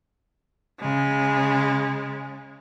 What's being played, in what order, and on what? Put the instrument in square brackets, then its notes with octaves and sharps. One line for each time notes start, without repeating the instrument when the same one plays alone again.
[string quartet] C#3 G#3